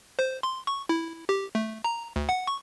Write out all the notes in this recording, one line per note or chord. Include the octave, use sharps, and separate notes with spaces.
C5
C6
C#6
E4
G4
A3
A#5
D2
F#5
C#6